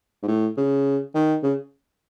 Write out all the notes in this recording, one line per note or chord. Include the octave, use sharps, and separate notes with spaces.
G#2
A2
C#3
D#3
C#3